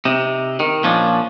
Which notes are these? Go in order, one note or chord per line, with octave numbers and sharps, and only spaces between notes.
C3 D#4
D#3
A#2 F3 C#4 D4